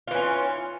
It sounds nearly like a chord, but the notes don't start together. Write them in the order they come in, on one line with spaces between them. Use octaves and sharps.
F4 E3 C#4